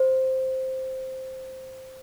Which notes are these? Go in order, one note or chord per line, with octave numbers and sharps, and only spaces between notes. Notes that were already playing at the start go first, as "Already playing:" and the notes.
Already playing: C5